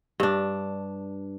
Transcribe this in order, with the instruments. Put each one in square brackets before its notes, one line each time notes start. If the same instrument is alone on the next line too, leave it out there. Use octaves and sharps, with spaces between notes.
[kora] G2 D4